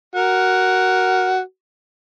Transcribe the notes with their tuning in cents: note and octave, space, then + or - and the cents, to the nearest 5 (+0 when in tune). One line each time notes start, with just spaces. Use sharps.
F#4 +10 A#4 +0